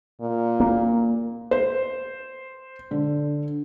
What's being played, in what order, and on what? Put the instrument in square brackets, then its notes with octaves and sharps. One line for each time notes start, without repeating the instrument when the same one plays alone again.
[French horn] A#2
[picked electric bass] A#3
[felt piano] C5
D3